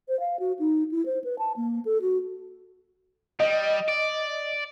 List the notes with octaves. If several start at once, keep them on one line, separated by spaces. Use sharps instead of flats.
C5
F5
F#4
D#4
E4
C5
B4
A5
A#3
A4
F#4
G3 D#5
D5